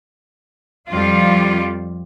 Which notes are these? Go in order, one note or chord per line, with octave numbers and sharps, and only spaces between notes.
F2 G3 F4